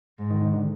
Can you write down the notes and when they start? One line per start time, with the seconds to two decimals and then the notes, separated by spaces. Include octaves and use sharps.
0.19 G#2
0.31 D#3
0.42 D#3
0.53 D3